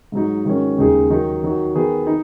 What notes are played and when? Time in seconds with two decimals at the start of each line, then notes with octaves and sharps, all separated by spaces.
0.12 G#2 F#3 D#4
0.45 G#2 D#3 F#3 C#4
0.78 D#2 C#3 G#3 D#4 G#4
1.10 D#3 F#3 D#4
1.43 D#3 F#3 D#4 F#4
1.75 D#3 B3 G#4
2.07 D#4